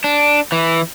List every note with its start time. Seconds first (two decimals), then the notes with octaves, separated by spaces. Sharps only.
0.04 D4
0.52 E3